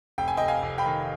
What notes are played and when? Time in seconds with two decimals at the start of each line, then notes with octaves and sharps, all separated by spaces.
0.18 F1 G5
0.28 G#5
0.37 F1 D#5 G5
0.48 F5 G#5
0.62 F1
0.78 G5 B5
0.86 D#3